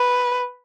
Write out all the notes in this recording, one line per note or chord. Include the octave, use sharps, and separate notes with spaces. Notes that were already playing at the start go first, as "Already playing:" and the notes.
Already playing: B4